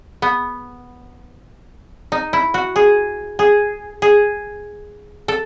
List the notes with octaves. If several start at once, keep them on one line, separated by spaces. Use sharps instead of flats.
B3
D#4
E4
F#4
G#4
G#4
G#4
A4